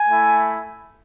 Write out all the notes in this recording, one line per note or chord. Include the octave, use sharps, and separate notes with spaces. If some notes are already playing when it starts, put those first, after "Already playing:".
Already playing: G#5
A3 E4